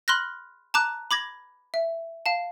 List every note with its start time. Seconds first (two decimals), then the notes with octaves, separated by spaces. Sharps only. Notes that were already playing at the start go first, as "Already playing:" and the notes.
0.08 B5 C6 F6 F#6 A#6
0.74 A5 A#5 D6 F#6
1.11 B5 D6 G#6 A#6
1.74 E5
2.26 F5 A5